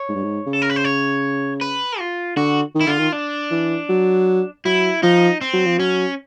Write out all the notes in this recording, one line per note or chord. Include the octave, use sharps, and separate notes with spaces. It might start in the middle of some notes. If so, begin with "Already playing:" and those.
Already playing: C#5
G#2
G2
G#2
C#3
A4
A#4
B4
C5
C#5
B4
F4
D3 F#4
D#3
E4
D3 F4
D#3
D4
E3
F#3
F#3 E4
F3 D#4
C4
F#3
F3
F#3 C#4